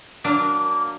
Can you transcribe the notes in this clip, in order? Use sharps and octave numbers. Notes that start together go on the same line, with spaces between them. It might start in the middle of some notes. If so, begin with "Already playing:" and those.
F#3 A#3 D4 A#4